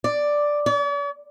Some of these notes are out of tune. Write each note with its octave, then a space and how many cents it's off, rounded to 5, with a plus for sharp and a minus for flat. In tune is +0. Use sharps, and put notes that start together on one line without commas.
D5 +0
D5 -45